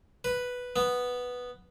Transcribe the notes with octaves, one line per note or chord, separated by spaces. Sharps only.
B4
B3